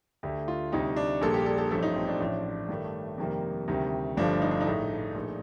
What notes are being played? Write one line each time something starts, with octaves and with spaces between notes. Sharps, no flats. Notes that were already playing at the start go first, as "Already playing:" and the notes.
D2 D3 A3 G4
F4
D2 C3 G3 D#4
D4
A#1 A#2 G3 A#3 A4
G4
A4
A4
A1 G2 F3 A3 A4
D#4
C4
D4
A1 A2 F3
G2 D#3 A3
F2 C3 D#3 G3 A#3
D2 C3 D#3 G3
G1 G2 F3 A3 D4
D#4
D4
D#4
A#1 A2 A3
A#1 A#2 A3